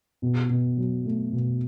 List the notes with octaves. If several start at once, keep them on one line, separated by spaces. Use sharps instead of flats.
B2
B2
F#3
A3
B2